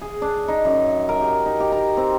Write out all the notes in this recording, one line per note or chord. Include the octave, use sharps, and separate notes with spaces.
G#4
D4
D#4
F#2
A#4
G4
D#4
G4
A#5
C4